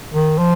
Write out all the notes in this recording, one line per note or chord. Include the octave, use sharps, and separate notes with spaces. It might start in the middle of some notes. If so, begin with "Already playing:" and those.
D#3
F3